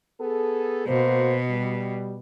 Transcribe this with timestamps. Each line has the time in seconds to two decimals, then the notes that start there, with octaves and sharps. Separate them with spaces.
0.19 B3 G#4 A4
0.87 B2 A#3 F#4 C5
1.48 G3